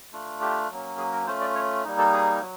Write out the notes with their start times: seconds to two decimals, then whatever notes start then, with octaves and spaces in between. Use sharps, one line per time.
0.12 A3 D4 F4
0.41 G4
0.70 F#3 A#3 C#4
0.98 G#4
1.13 A#4
1.27 A3 C#4 F4 C5
1.41 D5
1.55 C#5
1.84 G3 A#3 D#4
1.98 A4
2.13 G#4
2.41 F#3